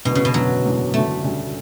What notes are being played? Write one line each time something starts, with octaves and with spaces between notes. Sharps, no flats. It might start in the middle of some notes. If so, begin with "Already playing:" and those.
F#1 E2 B2 D3
C#3
B2
F#1 E2 D3 F#3
F#1 E2 D3
F#1 E2 D3 A3
E1 D2 C#3 G3 D4